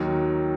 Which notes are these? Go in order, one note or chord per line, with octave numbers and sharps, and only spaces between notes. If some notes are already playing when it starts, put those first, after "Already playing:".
Already playing: D#2 D#3 F#3